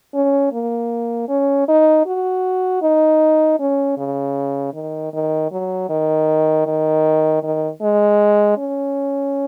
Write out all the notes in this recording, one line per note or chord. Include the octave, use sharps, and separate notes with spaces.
C#4
A#3
C#4
D#4
F#4
D#4
C#4
C#3
D#3
D#3
F#3
D#3
D#3
D#3
G#3
C#4